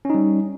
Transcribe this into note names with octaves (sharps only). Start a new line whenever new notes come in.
G3 C#4 D#4